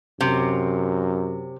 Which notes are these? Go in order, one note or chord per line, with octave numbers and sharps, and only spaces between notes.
F#2 C3